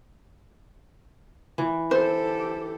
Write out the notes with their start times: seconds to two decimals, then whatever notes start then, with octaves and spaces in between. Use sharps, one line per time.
1.58 E3
1.91 G4 A4 C5